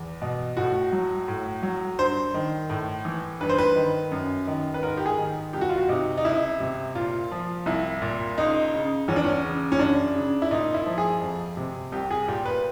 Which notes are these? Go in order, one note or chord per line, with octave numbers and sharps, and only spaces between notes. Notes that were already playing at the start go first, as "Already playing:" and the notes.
Already playing: E2
B2
A2 F#4
F#3
A2
F#3
G2 C5
D#3
A2
E3
G2 B4
C5
B4
D#3
F#2
D#3
B4
G#2 A#4
G4
G#4
D#3
C2 G4
F#4
F4
F#4
C3 D#4
D#4
C#2 E4
C3
A#2 F4
F3
C2 E4
A#2
C#2 D#4
C#3
E2 C#4
D4
C#4
C#3
C#4
F#2 D4
C#3
E4
A#2 D#4
E4
F3
G#4
F2
C3
C2 G4
G#4
A#2 G4
B4